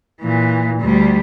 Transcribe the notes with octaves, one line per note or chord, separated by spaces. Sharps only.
A#2 E3
D2 G3